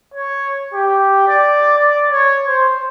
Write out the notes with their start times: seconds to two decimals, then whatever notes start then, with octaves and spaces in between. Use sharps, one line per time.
0.14 C#5
0.74 G4
1.28 D5
1.78 D5
2.10 C#5
2.48 C5